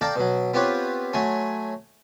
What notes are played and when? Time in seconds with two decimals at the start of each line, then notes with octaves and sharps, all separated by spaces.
0.01 A4 D5 F5 G5 A5 A#5
0.16 B2 F#3
0.54 B3 C4 F4 G4 B4 C#5
1.13 F#3 A3 C#5 G#5 C6